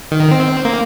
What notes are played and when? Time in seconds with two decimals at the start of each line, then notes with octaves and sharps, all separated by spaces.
0.11 D#3
0.31 C4
0.65 A#3